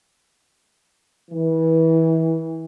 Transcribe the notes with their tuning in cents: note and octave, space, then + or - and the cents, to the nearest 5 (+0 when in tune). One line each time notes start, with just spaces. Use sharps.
E3 -25